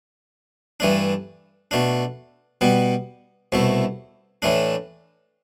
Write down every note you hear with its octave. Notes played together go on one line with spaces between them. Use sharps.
G2 E3 A3 D4
B2 A3 D4
B2 G3 B3
C2 B2 A3 E4
A2 E3 A3 D4